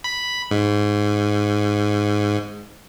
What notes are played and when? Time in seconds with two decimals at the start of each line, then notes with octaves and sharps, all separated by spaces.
0.04 B5
0.51 G#2